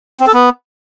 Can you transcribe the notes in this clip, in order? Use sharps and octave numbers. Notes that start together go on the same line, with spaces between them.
C4
A4
B3